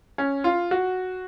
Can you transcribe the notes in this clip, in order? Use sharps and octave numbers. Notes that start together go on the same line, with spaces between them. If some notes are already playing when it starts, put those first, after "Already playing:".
C#4
F4
F#4